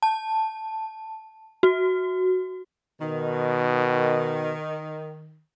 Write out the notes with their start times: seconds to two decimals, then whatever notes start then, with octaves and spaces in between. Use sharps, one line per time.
0.02 A5
1.63 F#4
3.01 B2 D#3